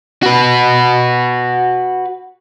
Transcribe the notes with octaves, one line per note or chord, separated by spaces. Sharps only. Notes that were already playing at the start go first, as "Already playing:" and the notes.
F#4 B4